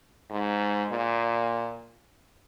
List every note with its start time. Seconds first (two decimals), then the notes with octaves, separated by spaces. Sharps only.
0.30 G#2
0.90 A#2